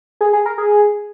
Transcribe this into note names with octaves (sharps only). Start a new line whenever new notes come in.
G#4
G#4
A#4
G#4